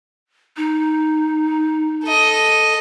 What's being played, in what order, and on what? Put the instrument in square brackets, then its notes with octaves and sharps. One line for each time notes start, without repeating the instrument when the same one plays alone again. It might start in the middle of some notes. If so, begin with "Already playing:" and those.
[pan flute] D#4
[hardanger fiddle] A4 D#5